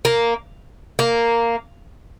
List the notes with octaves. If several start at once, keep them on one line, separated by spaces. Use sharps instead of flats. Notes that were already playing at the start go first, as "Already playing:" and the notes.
A#3
A#3